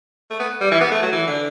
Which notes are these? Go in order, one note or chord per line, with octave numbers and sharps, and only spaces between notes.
A3
B3
G3
E3
B3
A3
F#3
E3
D3